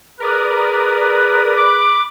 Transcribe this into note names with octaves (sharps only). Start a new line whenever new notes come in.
G#4 A#4 B4 D5 D#6
B5 D6 F#6 D7